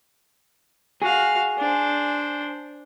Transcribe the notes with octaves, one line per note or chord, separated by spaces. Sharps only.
F#4 G#4 F5
D4 C5